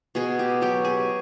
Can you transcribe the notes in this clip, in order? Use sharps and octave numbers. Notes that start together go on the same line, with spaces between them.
B2 G#4
G4
F#3 G4
G#4